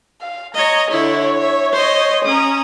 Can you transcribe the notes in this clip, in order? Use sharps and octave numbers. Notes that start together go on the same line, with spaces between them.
F5
C#5 D#5 A#5
D3 E4 C#5
E5
C5 D#5
C#4 A#5 D#6